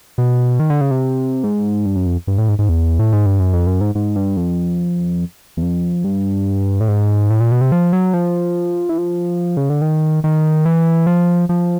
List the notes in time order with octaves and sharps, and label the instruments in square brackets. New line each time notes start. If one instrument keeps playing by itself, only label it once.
[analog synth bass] B2
D#3
D3
C#3
C3
G#2
G2
F#2
F2
G2
A2
G#2
G#2
E2
A2
G#2
G2
F#2
F2
F#2
G#2
G#2
G2
F2
E2
F2
G2
A2
G#2
A2
A#2
B2
C3
F3
F#3
F3
E3
F3
C#3
D3
D#3
D#3
E3
F3
F3